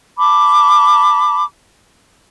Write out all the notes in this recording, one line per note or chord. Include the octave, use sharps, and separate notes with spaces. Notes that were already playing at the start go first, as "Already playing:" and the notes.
A5 B5 D6